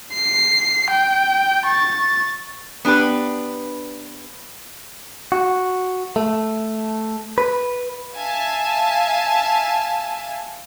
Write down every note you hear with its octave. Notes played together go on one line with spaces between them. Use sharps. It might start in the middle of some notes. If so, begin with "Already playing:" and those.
C7
G5
C#6 A6
B3 D4 G4 B4
F#4
A3
B4
E5 F5 G#5 A5